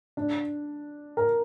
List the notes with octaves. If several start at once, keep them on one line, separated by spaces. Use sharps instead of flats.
D4
A#4